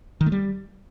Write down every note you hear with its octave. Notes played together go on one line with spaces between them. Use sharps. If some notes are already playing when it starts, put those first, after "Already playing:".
D#3
A3
G3